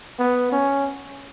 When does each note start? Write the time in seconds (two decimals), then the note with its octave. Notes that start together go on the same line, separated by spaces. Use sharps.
0.19 B3
0.52 C#4